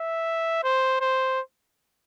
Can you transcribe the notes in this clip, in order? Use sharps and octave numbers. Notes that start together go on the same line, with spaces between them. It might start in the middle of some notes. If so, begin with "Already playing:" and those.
Already playing: E5
C5
C5